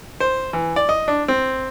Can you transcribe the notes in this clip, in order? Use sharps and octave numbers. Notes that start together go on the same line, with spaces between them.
C5
E3
D5
D#5
D4
C4